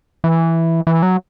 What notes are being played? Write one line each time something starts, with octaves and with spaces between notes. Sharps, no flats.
E3
E3
F#3